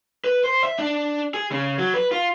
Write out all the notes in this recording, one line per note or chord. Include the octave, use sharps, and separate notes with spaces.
B4
C5
E5
D4
G#4
C#3
F#3
B4
F4